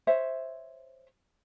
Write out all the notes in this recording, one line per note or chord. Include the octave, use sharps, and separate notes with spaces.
C5 C#5 E5